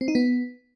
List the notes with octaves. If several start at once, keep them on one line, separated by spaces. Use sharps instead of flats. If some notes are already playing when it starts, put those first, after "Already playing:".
C4
D#4
B3